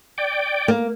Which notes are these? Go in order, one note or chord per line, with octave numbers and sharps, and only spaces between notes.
D5 G5
A#3